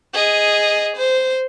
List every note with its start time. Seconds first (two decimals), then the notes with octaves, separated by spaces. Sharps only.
0.13 G#4 D#5
0.97 C5